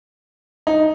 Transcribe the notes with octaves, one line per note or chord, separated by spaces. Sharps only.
D#4